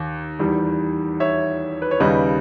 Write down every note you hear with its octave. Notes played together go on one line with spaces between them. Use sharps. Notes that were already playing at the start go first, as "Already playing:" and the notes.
Already playing: D#2
E2 D#3 G3
C#5 E5
B4
C#5
D#2 C#3 G3 B4 D#5